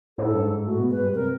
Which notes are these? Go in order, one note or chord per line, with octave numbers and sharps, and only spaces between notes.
A2 A4
G2
G#2
A2 F#4
B2
G#2 B4
G2
C3 A#4